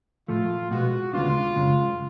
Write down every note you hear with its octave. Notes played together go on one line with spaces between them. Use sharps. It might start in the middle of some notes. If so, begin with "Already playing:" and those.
A2 F3 A3 F4
B2 G#3 B3 F#4
D2 C#3 G#3 B3 D4 F4
F#2 C#3 G#3